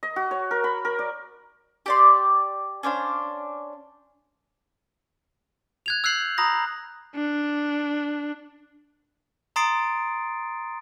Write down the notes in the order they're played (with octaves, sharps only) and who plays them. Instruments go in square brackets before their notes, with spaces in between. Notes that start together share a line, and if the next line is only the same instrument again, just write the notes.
[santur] D#5
F#4
C#5
A#4
B5
A#4
D5
[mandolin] G4 D5 C6
C#4 D4 C5 F5
[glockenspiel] F#6 G#6 F7
E6 F#6 G6 C7 F#7
A#5 B5 D#6 A#6
[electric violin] D4
[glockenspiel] A#5 C6 D#6 A6 C7 D7